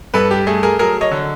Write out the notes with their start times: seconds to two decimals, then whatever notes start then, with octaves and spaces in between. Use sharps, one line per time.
0.14 G2 A4 B4
0.31 G4
0.47 A3 G#4
0.63 G#4 A#4
0.79 F#3 G#4 A#4
1.01 C#5 D#5
1.11 D3